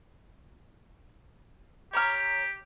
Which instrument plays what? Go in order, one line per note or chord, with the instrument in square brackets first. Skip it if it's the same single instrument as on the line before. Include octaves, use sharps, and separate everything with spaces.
[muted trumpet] G4 [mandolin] C#5 A#5 F6